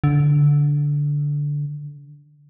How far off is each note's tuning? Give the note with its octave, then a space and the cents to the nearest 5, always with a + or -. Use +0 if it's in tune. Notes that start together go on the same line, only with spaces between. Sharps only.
D3 -10